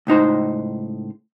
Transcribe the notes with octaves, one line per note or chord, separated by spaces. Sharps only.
C#2 A2 D#4 C5